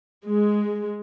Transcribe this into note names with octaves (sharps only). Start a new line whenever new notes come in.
G#3